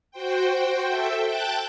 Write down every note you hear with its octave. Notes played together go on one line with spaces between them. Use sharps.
F#4 C5 G5
A4 E5 G5
G5 A5 F#6 G6 A6